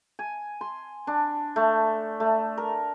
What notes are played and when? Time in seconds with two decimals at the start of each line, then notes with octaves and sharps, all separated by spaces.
0.19 G#5
0.61 C6
1.07 D4
1.56 A3
2.20 A3
2.58 A#4